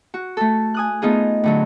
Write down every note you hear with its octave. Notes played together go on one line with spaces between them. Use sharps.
F#4
A3 A4
G#5 D#6 F#6
A3 B3 D#4 F4 G#4
A2 D3 F#3